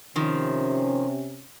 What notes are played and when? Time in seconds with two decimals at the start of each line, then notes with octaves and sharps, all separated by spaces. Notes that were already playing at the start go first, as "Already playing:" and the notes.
0.16 C3 D#3 F3 C#4